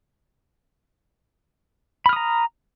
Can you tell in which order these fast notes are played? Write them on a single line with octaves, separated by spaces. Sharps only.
B5 F6 D#6 A#5